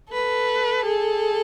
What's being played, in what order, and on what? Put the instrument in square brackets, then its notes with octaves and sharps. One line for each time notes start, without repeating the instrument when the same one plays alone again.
[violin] A4 [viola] B4
[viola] G#4